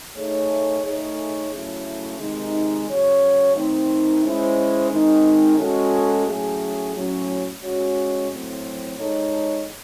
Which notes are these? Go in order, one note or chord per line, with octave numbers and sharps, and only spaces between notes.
A3 D#4 G#4 C#5
A3 D#4 G#4 C#5
C#3 F#3 A3 C#4 E4
C3 D#3 G#3 D#4
C#3 F#3 C#4 F#4 C#5
D#3 A3 C4 D#4
G#3 C#4 E4 C5
D#3 G#3 C4 D#4
G#3 C#4 F#4 A4
A2 F#3 A3 C#4 G#4
A2 F#3 C#4
G#3 C#4 F#4 C#5
A2 F#3 C4
G#3 D#4 A4 C#5